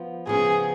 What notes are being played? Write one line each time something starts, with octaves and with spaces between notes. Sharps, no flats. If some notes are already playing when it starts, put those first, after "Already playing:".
Already playing: F3 B3 F4
C#3 F3 B3 G#4